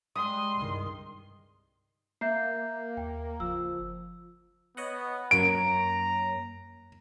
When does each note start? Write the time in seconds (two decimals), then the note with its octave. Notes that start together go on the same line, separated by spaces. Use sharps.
0.16 G3 G#3 C6 D#6
0.54 C2 G2 D#3
2.21 A#3 E5 G6 C7
2.97 D#2 G5
3.40 F#1 F3 E6
4.77 B3 C#5 D#5 F#5
5.31 F#2 A#3 C#5 A#5 D7